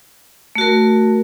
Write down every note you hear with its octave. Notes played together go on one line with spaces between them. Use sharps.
A3 F#4 A#4